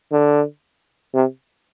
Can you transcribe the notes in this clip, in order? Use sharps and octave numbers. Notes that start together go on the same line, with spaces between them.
D3
C3